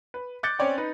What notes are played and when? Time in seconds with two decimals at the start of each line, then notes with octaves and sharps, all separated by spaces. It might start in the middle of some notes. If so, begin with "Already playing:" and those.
0.14 B4
0.43 D6 F#6 G6 A6 C#7
0.59 C4 C#4 C#5 D5 G5
0.78 D#4 B4